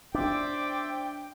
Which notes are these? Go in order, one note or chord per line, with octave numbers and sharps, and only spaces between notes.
D4 C5 D5 E5 G5 D6